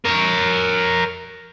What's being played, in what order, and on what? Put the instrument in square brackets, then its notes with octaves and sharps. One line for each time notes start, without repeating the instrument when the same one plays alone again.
[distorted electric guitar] A#4 C#5